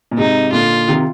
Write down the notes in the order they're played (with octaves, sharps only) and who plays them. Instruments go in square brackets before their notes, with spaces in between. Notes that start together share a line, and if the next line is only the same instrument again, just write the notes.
[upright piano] A#2
[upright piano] G#2 C3 [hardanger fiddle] D#4
[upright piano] A#2 D3 [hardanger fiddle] F4
[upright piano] C3 D#3